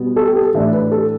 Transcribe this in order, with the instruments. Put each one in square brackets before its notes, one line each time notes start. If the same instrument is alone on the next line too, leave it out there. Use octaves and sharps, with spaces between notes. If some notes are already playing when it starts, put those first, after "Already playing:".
Already playing: [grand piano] B2 G3 B3
A4
G4
A4
A2 E3 A3 D4 E5
B4
A4